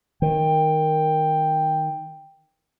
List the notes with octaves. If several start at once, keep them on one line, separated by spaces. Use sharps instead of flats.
D#3 G5